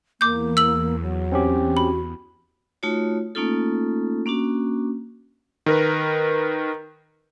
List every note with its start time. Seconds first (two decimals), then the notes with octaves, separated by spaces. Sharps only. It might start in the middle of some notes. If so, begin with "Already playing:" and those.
0.21 E2 A#3 D6 G6
0.57 E6 F#7
1.02 F#3
1.32 C4 C#4 G4
1.77 F#4 B5
2.83 A3 D#4 F4 F#4 C#5
3.35 A3 A#3 C#4 D#4 F4 A4
4.26 A#3 C#4 D4 F#4
5.66 D#3 A#4 B4